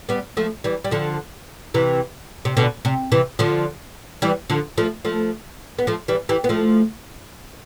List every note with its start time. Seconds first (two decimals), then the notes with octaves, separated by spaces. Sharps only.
0.09 G3 B3
0.37 F3 A3
0.64 E3 G3
0.84 G3
0.91 D3 F3
1.74 C3 E3
2.45 C3
2.57 B2 D3
2.85 C3
3.12 C3 E3
3.39 D3 F3
4.22 E3 G3
4.50 D3 F3
4.78 F3 A3
5.05 F3 A3
5.79 B3
5.87 F3 A3
6.08 E3 G3
6.29 E3 G3
6.44 B3
6.49 F3 A3